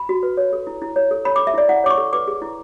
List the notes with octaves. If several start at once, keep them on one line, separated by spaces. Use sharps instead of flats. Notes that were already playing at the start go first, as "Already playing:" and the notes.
Already playing: B5
F#4
B4
C#5
A4
E4
E4
C#5
A4
C#5 B5
D6
A4
E5
E4 D5
E4 F#5
C#5 D6
C#6
A4
B4 D6
G#4
E4